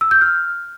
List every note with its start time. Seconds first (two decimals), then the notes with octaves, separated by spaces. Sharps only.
0.01 E6
0.11 G6
0.21 F6